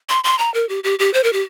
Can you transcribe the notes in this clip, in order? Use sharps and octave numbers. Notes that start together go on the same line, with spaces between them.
C6
C6
A#5
A#4
G4
G4
G4
C5
A#4
G4